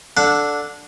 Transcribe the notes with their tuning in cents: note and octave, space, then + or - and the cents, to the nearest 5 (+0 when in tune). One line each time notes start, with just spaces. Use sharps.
D4 +0 A4 +0 F#5 -25